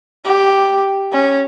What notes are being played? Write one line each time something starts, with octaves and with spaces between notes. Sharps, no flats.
G4
C#4